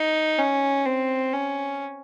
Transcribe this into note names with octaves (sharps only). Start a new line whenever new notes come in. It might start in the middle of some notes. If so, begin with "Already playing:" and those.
Already playing: D#4
C#4
C4
C#4